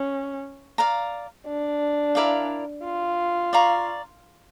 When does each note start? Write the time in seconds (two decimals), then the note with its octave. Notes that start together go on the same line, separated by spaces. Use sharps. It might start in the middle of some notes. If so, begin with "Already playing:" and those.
Already playing: C#4
0.78 D5 F5 A#5
1.47 D4
2.15 E4 A#4 D5 F5
2.85 F4
3.53 D5 F5 A#5 C#6